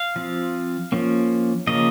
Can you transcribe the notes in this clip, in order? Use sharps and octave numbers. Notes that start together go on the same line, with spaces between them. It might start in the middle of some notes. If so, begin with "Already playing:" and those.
Already playing: F5
F3 C4
F3 A#3 C#4
C#3 F3 A#3 C#4 D#5